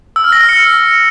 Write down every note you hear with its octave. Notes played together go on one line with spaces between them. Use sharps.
E6
F6
A#6
F6
C#7